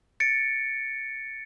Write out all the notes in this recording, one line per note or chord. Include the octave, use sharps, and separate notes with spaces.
A6 C#7 D7